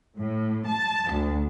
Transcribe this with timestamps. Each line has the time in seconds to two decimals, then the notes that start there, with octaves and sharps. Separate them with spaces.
0.20 A2
0.68 A5
1.12 D2